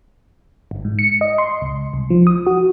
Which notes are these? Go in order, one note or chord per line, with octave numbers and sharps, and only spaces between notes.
G1
G#2
C#7
D#5
C6
C#2
C2
F3
D#6
F#4